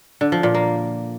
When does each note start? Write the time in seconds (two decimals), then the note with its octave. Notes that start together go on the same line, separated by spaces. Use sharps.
0.21 D3
0.32 F3
0.43 A#2
0.54 A#3